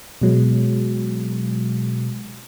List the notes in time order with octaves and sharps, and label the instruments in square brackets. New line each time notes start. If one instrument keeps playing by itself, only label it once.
[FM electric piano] B2 F#3 G#3